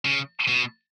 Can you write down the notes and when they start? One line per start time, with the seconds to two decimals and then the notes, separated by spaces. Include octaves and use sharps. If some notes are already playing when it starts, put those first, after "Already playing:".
0.05 C#3
0.48 B2